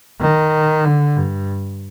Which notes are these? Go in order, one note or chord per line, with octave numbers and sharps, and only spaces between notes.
D#3
D3
G2